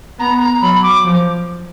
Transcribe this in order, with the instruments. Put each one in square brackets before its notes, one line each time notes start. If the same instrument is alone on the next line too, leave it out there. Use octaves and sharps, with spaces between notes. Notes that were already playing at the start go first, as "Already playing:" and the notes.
[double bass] B3 [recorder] A#5
[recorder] A#5
[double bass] F#3 [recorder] B5
[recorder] D6
[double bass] F3